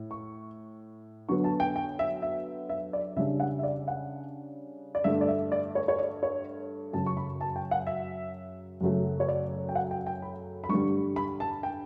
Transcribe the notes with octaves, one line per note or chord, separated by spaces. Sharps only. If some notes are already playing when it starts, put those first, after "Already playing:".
Already playing: A2
C#6
D3 F#3 B3 C#6
A5
G5
G5
E5
E5
E5
D5
C#3 G3 D4 E5
F#5
E5
D5
F#5
D5
G2 D3 A3 E5
D5
E5
D5
C#5
C#5
D5
C#5
F#2 C#3 F#3 A5
C#6
B5
A5
G5
F#5
E5
F#2 C#3 F#3 A3
C#5
D5
G5
F#5
G5
G5
B5
B5
G2 D3 G3 C#6
B5
A5
G5